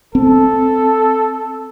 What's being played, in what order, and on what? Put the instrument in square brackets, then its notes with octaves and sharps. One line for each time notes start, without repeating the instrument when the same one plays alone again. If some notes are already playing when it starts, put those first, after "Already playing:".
[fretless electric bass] C4 [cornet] A4